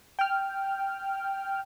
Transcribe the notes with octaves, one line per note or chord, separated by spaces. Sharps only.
G5 F6